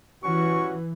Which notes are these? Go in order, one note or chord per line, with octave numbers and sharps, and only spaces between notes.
E3 G3 C#4 F#4 C#6